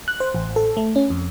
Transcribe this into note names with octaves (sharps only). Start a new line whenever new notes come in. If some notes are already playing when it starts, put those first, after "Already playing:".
F#6
C5
A1
A4
A3
C#4
F2